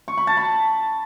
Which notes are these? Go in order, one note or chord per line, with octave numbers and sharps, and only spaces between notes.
C#6
B5
A5
B5